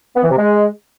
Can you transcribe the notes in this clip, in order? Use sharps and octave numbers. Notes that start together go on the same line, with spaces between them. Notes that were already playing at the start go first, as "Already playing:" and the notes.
B3
E3
C3
G#3